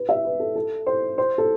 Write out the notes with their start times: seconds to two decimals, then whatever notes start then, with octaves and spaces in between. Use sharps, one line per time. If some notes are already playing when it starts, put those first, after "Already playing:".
Already playing: B4
0.09 E5
0.25 B4
0.40 A4
0.56 A4
0.86 C5
1.18 C5
1.38 A4